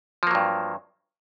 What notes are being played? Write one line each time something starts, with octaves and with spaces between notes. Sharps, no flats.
G2 F3 F#3 A#3